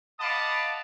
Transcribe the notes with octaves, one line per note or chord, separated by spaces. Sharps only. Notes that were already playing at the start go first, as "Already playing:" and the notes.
D#5 F5 F#5 A5 B5 D6